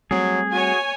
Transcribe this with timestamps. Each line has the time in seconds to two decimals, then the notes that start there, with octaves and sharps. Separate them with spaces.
0.11 F#3 G3 A3 C4 G#4
0.52 F#4 C#5 G#5